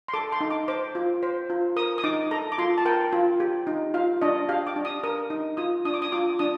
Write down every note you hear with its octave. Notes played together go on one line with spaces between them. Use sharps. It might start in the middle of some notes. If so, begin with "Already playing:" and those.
C6
A4 D6
C6
D#4
D6
C5 D6
F4
C5
F4
A#4 D#6
D#6
D#4 D6
A4 A#5
D6
F4 C6
A5
A#4 G5
F4
G4
D#4
F4 F5
D4 D#5
G4 F5
D6
D4
D#6
A#4 D#6
D#4
F4 D#6
D4 D#6
D6
D#6
F4 D6
D4 D#6